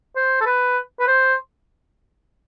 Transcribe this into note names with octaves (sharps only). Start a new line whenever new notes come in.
C5
A4
B4
B4
C5